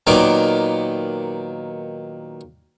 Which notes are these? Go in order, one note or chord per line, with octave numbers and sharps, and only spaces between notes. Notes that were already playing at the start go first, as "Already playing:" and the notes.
A#2 D#3 F#3 B3 D6